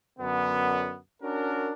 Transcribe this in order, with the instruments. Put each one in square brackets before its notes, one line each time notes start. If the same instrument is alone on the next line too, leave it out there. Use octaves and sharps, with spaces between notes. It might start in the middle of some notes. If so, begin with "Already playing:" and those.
[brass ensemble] F#2 D3 B3
C#4 D4 F#4 A#4